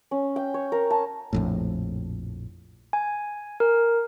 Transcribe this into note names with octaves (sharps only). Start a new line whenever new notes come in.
C#4
G5
C#5
A#4
A5
A#1 F2 A2
G#5
A#4